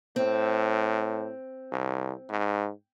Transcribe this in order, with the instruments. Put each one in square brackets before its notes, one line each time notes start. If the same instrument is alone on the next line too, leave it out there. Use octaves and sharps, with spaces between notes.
[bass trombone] A2 [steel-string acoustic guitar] C4
[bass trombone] C2
G#2